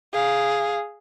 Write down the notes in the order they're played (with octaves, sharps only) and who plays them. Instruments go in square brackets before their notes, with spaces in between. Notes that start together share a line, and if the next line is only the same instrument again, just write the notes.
[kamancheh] G#4 F5